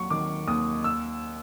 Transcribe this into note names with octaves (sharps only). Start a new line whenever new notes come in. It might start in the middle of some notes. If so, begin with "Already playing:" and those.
Already playing: D#2 F#3 C#6
D#3 D6
D#2 D#6
E6